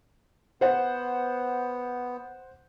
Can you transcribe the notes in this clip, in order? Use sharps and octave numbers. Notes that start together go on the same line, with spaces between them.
B3 C5 F#5